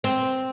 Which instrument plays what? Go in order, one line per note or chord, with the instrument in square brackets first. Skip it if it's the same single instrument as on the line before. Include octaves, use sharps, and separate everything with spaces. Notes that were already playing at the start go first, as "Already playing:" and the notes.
[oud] C4